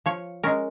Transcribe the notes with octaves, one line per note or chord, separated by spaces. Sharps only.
F3 C#5
G#3 C#4 A#4